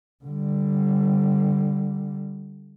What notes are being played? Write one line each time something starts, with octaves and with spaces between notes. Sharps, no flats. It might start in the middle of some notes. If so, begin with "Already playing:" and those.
D3 G3